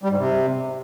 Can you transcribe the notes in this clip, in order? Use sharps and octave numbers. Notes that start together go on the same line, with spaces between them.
G3
G#2
C3